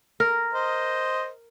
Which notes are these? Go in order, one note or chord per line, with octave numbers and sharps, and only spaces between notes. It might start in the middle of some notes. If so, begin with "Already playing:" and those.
A#4
C5 D#5